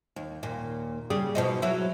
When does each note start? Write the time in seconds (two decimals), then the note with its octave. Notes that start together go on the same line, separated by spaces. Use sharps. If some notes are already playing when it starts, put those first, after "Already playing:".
0.16 D#2
0.43 D#2 A#2
1.10 C#3 G3 G#4
1.35 B2 F3 D#4
1.62 F#3 E4